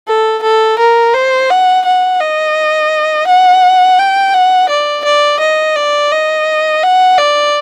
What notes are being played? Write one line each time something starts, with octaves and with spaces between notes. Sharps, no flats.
A4
A4
A#4
C5
F#5
F#5
D#5
F#5
G5
F#5
D5
D5
D#5
D5
D#5
F#5
D5